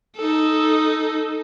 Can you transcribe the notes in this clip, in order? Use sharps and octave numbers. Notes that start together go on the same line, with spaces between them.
D#4 A4